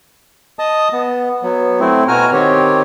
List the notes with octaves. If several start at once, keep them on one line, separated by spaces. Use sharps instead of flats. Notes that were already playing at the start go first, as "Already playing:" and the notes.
D#5 A5 D#6
B3
F#3 B3
A3 C4 E4
B2 F#4 G#5 A#5 F6
D#3 C4 G4 C#5